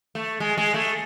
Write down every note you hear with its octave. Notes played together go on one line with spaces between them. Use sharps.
A3
G#3
G#3
A3